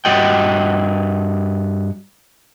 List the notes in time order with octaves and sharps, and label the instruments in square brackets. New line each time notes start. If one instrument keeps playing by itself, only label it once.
[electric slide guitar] G2 F#4 D#5 G5